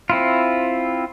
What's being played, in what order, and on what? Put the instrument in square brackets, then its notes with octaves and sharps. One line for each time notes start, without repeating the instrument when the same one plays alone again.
[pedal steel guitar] C4 E4 F4